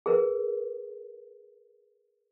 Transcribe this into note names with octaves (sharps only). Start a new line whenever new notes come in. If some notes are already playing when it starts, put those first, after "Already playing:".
G#4 A#4 B4